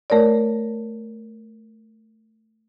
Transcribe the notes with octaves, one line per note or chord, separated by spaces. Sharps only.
A3 A#4 C#5 D5